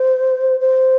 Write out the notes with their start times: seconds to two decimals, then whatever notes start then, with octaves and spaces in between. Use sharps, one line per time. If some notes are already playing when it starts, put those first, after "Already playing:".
Already playing: C5
0.60 C5